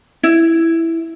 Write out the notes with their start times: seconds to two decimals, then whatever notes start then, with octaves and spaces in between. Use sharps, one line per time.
0.23 E4